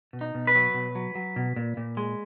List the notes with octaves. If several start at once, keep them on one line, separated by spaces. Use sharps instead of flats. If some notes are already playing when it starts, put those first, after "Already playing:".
B2
D#4
B2
B4
F#3
B2
F#3
F#3
B2
A#2
A#2
G#3